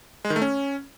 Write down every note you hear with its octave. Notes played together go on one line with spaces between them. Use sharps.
G#3
D#3
A3
C#4